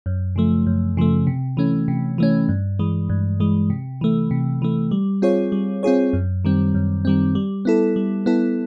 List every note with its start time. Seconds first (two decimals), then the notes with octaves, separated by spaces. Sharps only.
0.06 F#2
0.36 C#3 F3 A3
0.66 F#2
0.97 C#3 F3 A3
1.27 C3
1.57 E3 A3 C#4
1.88 C3
2.18 E3 A3 C#4
2.49 G2
2.79 E3 G#3
3.09 G2
3.40 E3 G#3
3.70 C3
4.01 E3 A3
4.31 C3
4.62 E3 A3
4.91 G3
5.22 C4 F4 G#4 C#5
5.52 G3
5.83 C4 F4 G#4 C#5
6.13 F#2
6.45 D#3 G3 C4
6.75 F#2
7.05 D#3 G3 C4
7.35 G3
7.65 B3 E4 A4
7.96 G3
8.26 B3 E4 A4